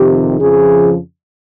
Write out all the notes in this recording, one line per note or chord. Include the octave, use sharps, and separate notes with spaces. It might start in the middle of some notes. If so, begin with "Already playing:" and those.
Already playing: F2 C3 D#3 G4
F2 C#3 F3 G#4